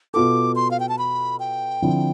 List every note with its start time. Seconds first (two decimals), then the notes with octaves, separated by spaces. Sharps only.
0.14 B2 B3 F4 A4 D6
0.56 C6
0.71 F5
0.80 G5
0.89 A5
0.99 B5
1.40 G5
1.82 D3 F3 C4 E4